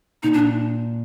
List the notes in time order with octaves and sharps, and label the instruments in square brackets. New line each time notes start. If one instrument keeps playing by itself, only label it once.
[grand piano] A#2 [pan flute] D#4
[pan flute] D4